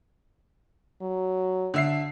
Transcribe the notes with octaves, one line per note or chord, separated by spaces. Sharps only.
F#3
D3 E5 C7